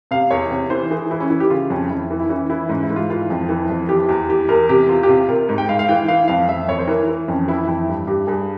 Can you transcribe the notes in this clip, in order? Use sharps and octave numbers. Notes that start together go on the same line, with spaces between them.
C3 F5
E2 C#5
C3
E3 C5
E3 G#4
E3 E4
C#4
E3 E4
G4
C#3 F4
F2 C#4
F2 E4
E3
E4
E3 C#4
E3 E4
G#2 C#4
E4
G#2
F4
E3 F4
F2
E3
F2
E3 G4
E2 G4
E3 G4
E2 A#4
C3 G4
E2 F4
G4
C3 F4
C3 A#4
G#2
G5
G#2 F5
F5
E3 G5
E3 F5
F2 F5
F2 E5
F2 C#5
C5
E3 A#4
E3
F2 C#4
E3 E4
F2 E4
G2
G2 G4
G2 G#4